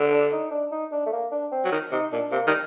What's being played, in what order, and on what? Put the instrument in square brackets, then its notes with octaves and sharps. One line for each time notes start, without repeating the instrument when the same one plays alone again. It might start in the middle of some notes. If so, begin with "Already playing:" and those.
Already playing: [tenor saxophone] D3
[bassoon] D4
D#4
D4
D#4
D4
A3
A#3
D4
C4
[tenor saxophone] F#3
D#3
[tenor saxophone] C3 [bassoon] D#4
[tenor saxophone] A#2 [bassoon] D4
[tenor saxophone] C3 [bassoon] A#3
[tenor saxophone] D#3 [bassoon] G3